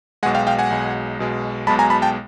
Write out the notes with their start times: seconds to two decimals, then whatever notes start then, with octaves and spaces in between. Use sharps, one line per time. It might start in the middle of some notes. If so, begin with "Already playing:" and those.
0.23 B1 B2 G#3 F#5 G#5
0.35 F5 G5
0.47 F5 G5
0.59 F#5 G#5
0.70 B1 B2 G#3
1.19 B1 B2 G#3
1.67 B1 B2 G#3 A5 B5
1.79 G#5 A#5
1.90 A5 B5
2.02 G5 A5